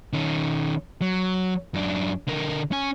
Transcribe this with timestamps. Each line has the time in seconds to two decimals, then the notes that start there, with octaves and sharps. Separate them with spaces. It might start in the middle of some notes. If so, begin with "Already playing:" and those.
0.13 D#3 C#4
1.01 F#3
1.74 F#2 D4
2.27 D3 A#4
2.72 C#4 G#5